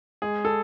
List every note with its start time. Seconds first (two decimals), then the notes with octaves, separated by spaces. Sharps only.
0.22 G#3 G#4
0.45 A4